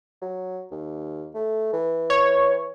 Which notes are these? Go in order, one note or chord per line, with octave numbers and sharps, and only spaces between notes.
F#3
D#2
A3
E3
C#5